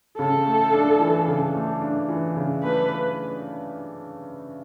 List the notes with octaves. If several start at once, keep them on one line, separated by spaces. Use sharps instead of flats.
C#3 A4
A3
D4
E3
C#3
A3
D4
E3
C#3
A3 B4